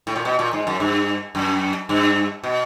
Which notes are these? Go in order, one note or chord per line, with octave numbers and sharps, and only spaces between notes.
A2
A#2
B2
A#2
G#2
F#2
G2
F#2
G2
B2